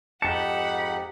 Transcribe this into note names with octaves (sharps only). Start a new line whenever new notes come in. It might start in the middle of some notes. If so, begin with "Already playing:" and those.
F2 G#2 D#4 G4 F#5 A5 B5 C#7